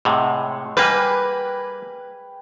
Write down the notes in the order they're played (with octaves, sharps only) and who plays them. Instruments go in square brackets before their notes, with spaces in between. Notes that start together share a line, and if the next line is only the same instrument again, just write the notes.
[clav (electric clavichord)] A2 C3 [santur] G#3 F#5
[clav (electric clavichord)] G3 A#3 [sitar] B4 [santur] G5 G#5